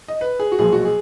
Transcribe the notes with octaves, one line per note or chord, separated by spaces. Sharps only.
D#5
B4
G#4
F#4
B1 A#2 F3 G#3 G#4
F#4
G#4